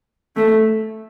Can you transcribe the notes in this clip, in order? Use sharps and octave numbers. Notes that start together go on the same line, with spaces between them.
A3